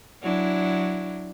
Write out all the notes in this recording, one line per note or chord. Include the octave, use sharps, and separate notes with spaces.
F#3 D4 E4